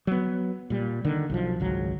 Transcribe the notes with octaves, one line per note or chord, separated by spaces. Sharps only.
F#3 B3
A#2 G3
D3 D#3
B1 D#3 F3
G#1 C#2 F#3